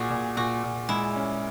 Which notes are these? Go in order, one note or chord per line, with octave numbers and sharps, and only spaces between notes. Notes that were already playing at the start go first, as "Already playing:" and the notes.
Already playing: A#2 F#4 G#4
A#2
A#2 F#4
A#2
G#3 E4
C#4